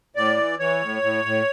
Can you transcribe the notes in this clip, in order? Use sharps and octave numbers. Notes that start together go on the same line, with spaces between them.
A2 D5
E3
E3 C#5
A2
A2
A2